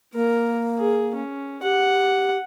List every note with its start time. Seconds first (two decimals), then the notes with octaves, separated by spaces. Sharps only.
0.14 A#3 A#4
0.79 G#4
1.16 C#4
1.63 G4 F#5